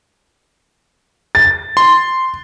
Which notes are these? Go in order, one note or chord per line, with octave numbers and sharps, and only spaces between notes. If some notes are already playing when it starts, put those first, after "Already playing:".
A6
C6